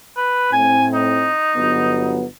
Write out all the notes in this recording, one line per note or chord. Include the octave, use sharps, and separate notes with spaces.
B4
A2 C4 G#5
D#4
G1 F#3 B3